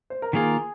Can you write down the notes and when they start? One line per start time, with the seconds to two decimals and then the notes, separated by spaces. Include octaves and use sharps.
0.10 C5
0.22 A#4
0.33 D#3 A#3 F4 G#4